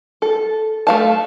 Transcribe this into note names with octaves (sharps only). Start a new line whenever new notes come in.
A4
A3 F5 A5